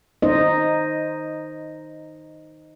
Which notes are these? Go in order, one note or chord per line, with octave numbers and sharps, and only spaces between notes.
D#4 C5 D#5